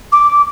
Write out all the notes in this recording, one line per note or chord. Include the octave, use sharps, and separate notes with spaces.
D6